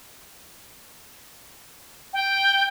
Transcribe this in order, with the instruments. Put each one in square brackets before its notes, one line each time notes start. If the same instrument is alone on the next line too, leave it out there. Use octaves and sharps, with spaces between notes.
[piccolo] G5